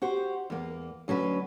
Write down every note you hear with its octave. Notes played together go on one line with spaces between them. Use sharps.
F#4 G4 C5
E2 A#3
D2 F#3 C#4 B4